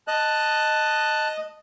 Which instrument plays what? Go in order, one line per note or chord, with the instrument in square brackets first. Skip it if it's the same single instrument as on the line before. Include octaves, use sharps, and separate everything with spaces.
[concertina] D#5 [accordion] A5 F#6